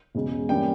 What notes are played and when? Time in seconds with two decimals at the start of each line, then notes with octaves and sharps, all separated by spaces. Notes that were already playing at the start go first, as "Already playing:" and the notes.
0.15 E1 E2 C#3 G#3
0.49 G2 E3 A#3 C#4 G5